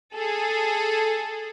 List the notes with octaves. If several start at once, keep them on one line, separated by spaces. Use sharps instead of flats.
G#4 A4